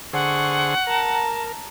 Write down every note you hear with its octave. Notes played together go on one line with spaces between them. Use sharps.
D3 G#4 C5 F#5 C#6
A#4 A5 A#5